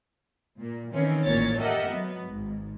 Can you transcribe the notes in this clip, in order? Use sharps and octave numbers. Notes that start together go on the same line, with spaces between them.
A#2
D#3 E3 C4 C#4
A1 E2 A#2 C#5 A6
G4 A4 A#4 D#5 E5 F#5
F#3 B3
G#1 G#2